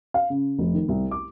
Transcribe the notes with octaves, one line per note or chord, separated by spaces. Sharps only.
F5
C#3
F1
D#3
C2
D6